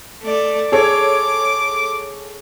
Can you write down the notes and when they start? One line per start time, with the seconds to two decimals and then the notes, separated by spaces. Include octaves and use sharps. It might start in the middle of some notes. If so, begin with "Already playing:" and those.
0.22 A3 D5
0.72 G#4 A4 C#5 D6